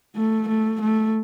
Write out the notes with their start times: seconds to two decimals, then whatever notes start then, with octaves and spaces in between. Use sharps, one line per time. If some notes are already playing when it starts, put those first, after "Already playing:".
0.16 A3
0.48 A3
0.81 A3